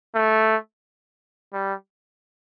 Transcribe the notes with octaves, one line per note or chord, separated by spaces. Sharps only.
A3
G3